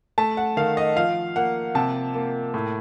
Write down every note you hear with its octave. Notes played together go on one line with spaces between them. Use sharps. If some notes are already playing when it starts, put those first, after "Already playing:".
A3 A5
F#5
D#3 F5
D#5
F3 F5
A#3 F#5
C3 A5
A#3
A2